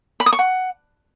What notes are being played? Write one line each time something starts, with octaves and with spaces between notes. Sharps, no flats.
B5
D#6
C#6
F#5